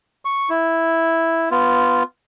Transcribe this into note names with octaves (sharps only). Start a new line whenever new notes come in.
C#6
E4
B3 F4